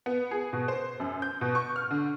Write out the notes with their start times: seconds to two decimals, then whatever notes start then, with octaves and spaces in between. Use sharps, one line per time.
0.06 B3
0.31 G#4
0.53 B2
0.68 C5
1.00 F#2
1.22 G6
1.41 B2
1.55 C#6
1.76 F6
1.91 D3